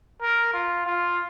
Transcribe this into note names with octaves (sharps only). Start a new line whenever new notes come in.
A#4
F4
F4